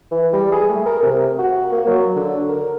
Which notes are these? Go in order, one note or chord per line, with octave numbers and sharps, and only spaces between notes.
E3
G3
G#4
A3
A#4
C3
F#4
A#3
F#3
D3
A#4